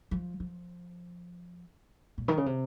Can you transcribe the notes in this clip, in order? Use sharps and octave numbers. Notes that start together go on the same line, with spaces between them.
F3
F3
A#2
D#3
C#3
C3